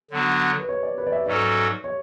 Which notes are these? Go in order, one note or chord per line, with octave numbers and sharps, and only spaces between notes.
D3 F#3 B3 D4 F#4
B4
C#5
D5
B4
D5
E5
G#2 F#3 C#4 F#4 A4 D5
C#5